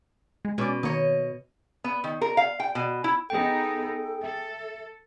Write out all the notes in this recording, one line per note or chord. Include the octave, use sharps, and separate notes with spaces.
G#3
B2 G#3 C#4 D5
D#3 A#3 C#5 D#5
B3
D#3
A#4
F5
G5
B2
E4
B3 D#4 G#4 A4 G5
A4 E5